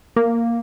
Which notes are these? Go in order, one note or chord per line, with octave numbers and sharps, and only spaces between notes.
A#3